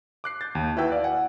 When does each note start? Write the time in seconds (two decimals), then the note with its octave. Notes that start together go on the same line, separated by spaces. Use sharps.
0.24 D6 F#6 C7
0.41 G6 A6
0.55 D#2
0.77 E4 F#4 B4 G5 E6
0.92 D5 F5
1.04 F#5 G#5